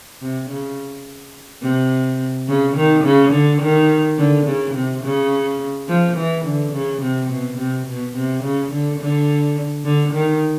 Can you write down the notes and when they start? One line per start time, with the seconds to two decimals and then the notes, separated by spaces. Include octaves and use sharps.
0.22 C3
0.50 C#3
1.62 C3
2.49 C#3
2.76 D#3
3.05 C#3
3.33 D3
3.62 D#3
4.18 D3
4.47 C#3
4.74 C3
5.04 C#3
5.89 F3
6.17 E3
6.45 D3
6.73 C#3
7.02 C3
7.30 B2
7.58 C3
7.87 B2
8.15 C3
8.43 C#3
8.72 D3
9.00 D3
9.85 D3
10.14 D#3